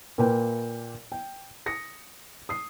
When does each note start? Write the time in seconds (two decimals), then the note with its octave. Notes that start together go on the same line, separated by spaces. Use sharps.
0.18 A#2 A#3 B4 G5
1.12 G5
1.66 D#6 A#6 C#7
2.49 D#6 C7